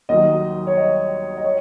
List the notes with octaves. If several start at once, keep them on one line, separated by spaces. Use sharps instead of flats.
D#2 D#3 F#3 D#5
C#5
D#5
D#5
C#5